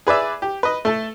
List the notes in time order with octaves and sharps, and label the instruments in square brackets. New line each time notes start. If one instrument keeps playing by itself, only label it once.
[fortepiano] G#4 B4 D5 E5
G4
B4 D#5
A3 A4